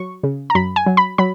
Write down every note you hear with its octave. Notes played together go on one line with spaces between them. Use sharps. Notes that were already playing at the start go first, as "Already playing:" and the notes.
Already playing: F#3 C#6
C#3
A#5
F#2 B5
G#5
F#3
B5
F#3 B5